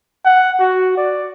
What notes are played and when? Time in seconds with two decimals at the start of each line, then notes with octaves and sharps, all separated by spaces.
0.25 F#5
0.60 F#4
0.97 D5